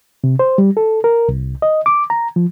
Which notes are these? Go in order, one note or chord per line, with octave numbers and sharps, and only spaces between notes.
C3
C5
G3
A4
A#4
C2
D#5
D6
A#5
F3